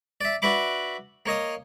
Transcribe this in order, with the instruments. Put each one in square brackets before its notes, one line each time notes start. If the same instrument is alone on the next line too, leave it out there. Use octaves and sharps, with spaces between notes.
[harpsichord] D5 E5
D4 F#4 B4 E5 B5 D6
A#3 C#5 D#5 D#6